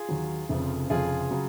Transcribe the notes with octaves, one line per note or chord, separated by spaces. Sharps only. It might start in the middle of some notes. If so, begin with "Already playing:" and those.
Already playing: F4 G#4
D#2 D#3 F#3
F1 F2 C#3 F3
F1 F2 C#3 F3 F4 G#4
C#3 F#3